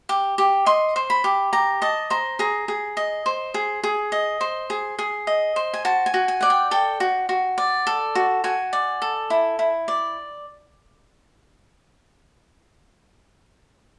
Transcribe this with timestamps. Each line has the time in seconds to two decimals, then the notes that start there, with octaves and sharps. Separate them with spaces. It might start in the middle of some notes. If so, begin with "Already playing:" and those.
0.09 G4
0.38 G4
0.66 D#5 C6
0.96 C5
1.10 B5
1.24 G4
1.53 G4 A#5
1.82 D#5 A5
2.10 C5 A#5
2.39 G#4 A#5
2.68 G#4
2.97 D#5
3.26 C5
3.54 G#4
3.83 G#4
4.12 D#5
4.41 C5
4.70 G#4
4.99 G#4
5.27 D#5
5.56 C5
5.74 G#5
5.85 F#4 A5
6.06 G#5
6.14 F#4
6.28 G#5
6.41 D5 F#5
6.50 G5
6.71 A4 G5
7.00 F#4
7.29 F#4
7.58 D5
7.87 A4
8.15 F#4
8.44 F#4 G#5
8.73 D5
9.02 A4
9.30 E4
9.59 E4
9.88 D5